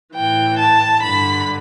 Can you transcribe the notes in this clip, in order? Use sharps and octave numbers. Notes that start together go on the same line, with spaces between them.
A2 E3 G5
A5
G2 D3 B5